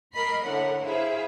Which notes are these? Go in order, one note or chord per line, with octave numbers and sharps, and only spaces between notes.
A#4 D#5 B5 C7
A2 D3 A#4 F#5
E4 G#4 C5 E5 F5